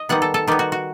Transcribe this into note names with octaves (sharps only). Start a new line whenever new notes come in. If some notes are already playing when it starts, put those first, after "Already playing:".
Already playing: D#5
D#3 G3 B3 F#5
A4
A4
D#3 G3 B3 G4
F#4
F#4